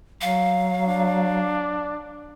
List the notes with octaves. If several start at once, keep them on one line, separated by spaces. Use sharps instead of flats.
F#3 F5
D4